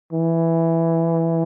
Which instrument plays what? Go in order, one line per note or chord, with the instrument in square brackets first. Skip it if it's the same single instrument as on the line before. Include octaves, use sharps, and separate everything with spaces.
[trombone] E3